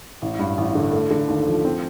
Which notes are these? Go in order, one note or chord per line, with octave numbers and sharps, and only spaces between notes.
A1
G2
A1
D3
A3
D3
D#2
F3
C4